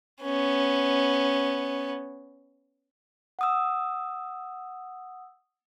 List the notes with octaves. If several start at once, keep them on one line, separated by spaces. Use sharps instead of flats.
B3 C#4
F#5 D#6 E6